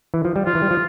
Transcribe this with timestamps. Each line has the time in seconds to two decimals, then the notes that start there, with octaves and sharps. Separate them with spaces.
0.14 E3
0.25 F3
0.36 G3
0.46 F3 F4
0.55 E3
0.62 G3
0.71 F3